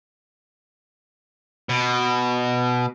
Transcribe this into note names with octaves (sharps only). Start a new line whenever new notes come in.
B2